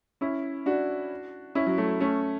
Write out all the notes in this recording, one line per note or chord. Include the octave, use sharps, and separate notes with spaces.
C#4 E4
D4 F#4
C#4 E4
F#3
F#3 A3
A3 C#4